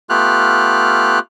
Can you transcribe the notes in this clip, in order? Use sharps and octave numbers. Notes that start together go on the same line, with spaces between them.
A3 B3 F4 G4 F6 F#6